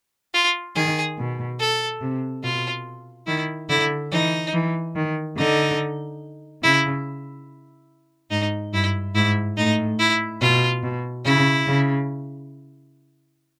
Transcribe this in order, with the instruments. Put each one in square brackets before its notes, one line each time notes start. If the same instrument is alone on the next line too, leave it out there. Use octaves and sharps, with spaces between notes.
[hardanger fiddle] F4
[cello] D#3 [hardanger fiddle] G#4
[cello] B2
[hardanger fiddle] A4
[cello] C3
[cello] B2 [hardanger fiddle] F4
[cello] D#3 [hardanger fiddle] E4
[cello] D3 [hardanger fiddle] E4
[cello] E3 [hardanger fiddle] D#4
[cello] E3
D#3
[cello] D3 [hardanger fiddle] D#4
[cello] C#3 [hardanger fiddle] E4
[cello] G#2 [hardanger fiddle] D#4
[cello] G2 [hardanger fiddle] E4
[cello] G#2 [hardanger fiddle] E4
[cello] A2 [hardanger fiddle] D#4
[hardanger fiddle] E4
[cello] B2 [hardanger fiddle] F4
[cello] B2
[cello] C#3 [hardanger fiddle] E4
[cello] C#3